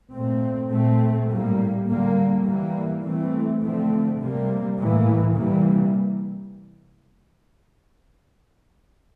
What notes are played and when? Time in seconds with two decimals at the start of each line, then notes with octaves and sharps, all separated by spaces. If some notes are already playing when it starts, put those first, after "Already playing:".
0.13 A#2 A3 C4
0.71 A#2 A3 C4
1.29 A2 G3 A#3
1.87 D3 G3 A#3
2.45 E3 G3 A#3
3.03 E3 A3 C4
3.62 D3 F3 A3 C4
4.19 C3 G3 A#3
4.78 A2 E3 A#3
5.35 C3 E3 G3 A#3